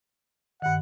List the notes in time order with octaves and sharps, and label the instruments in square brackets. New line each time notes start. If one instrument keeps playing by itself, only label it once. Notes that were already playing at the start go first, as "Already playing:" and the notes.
[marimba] G2 D#3 [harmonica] F#5